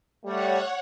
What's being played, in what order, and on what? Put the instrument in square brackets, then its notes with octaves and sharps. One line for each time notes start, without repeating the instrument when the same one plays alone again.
[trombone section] G3 A3 [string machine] C#5 F#5